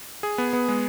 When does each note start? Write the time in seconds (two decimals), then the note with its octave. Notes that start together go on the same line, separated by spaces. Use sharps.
0.23 G#4
0.38 B3
0.53 B3
0.68 G#3